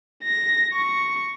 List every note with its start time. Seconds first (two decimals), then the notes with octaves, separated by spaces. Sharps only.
0.24 A#6
0.73 C#6